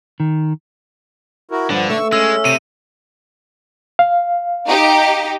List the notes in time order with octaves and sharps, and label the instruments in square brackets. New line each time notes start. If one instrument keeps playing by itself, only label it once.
[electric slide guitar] D#3
[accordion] E4 F#4 A#4
[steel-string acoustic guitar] G2 F#5 [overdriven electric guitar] D3 [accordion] F3
[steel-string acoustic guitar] A3 [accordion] C#6 E6
[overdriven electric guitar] G#3 [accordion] C#4 [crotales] E6
[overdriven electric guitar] C3 [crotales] D#7
[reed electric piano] F5
[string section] D#4 G4